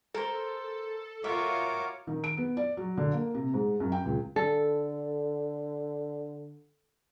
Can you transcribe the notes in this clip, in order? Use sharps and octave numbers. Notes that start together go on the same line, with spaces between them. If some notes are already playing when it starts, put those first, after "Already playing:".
A4 A#4 C5
F4 F#4 A#4 C#5 E5 D6
D#3
D7
B3
D5
F#3
D3
A#3
C3
G#2
F#2
G5
C#2
D3 A4